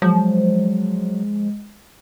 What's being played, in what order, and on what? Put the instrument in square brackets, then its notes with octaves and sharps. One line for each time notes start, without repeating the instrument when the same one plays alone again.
[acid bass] F3 [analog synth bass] F#3 [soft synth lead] G#3